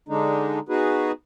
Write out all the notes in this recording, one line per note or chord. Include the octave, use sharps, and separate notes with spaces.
D3 G#3 D4 D#4
B3 D#4 F#4 G#4 B4